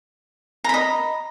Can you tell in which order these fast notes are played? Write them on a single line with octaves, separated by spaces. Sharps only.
A#5 B5 D#5